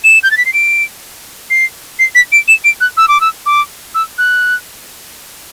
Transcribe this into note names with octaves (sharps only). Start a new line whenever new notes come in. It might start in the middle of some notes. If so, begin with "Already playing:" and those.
E7
G6
A6
B6
C7
D7
C7
C7
B6
D7
E7
D7
F#6
E6
D6
E6
D6
E6
F#6